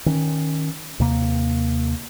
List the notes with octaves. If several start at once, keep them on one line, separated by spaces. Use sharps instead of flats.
D#3 C#4
D#2 C3 A#3